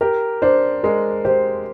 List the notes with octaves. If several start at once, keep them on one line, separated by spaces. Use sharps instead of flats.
G4 A#4
D4 C5
G#3 A#4
G4 C5